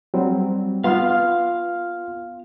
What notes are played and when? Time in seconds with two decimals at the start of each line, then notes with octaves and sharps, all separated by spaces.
0.14 F#3 G3 C4
0.84 B3 F4 F5 C6 F6